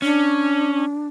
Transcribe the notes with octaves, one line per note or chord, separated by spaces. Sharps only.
C#4 D4